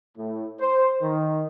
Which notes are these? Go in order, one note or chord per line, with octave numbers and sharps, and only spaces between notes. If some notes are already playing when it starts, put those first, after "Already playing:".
A2
C5
D#3